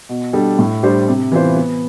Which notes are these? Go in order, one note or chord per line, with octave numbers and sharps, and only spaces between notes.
B2
G3 D4 A4
A2
G3 D4 G4 C5
C3
E3 B3 F4 C5
B3